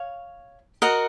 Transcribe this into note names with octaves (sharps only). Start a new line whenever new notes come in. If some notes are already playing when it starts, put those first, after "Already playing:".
Already playing: C#5 F5
F#4 A#4 D#5 F#5